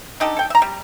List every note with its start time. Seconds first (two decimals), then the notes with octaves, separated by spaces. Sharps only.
0.20 D4 D#4 G4 A4
0.37 A4 G5
0.50 E5 A#5
0.62 G3